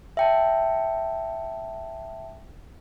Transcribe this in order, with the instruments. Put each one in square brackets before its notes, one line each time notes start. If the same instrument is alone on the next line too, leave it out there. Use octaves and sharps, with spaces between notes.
[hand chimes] E5 G5 A5